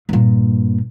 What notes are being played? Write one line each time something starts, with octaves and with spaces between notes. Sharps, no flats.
G2 A#2